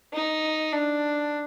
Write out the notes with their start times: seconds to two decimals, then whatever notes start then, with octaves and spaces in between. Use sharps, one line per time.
0.14 D#4
0.73 D4